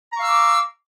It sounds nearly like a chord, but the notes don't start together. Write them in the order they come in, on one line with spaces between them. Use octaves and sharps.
A#5 C#6 F5 E6 D6